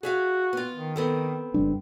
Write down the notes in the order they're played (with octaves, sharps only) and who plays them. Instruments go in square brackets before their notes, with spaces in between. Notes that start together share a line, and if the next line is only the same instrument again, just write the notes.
[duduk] F#4 [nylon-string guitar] G#4 E5 F5
[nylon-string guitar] B3 F4
[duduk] D#3
[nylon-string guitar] B3 C4 A4
[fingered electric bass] F#1 G3 D4